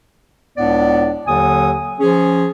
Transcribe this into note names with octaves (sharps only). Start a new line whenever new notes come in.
C#2 A2 B3 D4 D5
D#2 D3 F#3 G#5 D#6
F3 C#4 G#4